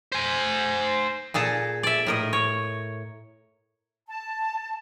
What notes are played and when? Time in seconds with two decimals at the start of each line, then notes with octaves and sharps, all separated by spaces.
0.12 C5 G#5
1.34 A#2 G#4 A4 A#5
1.83 D5 E5
2.07 A2 A#4 D#5
2.33 C#5
4.07 A5